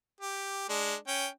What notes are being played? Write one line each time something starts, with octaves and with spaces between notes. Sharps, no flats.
G4
G#3 D4
C#4 G5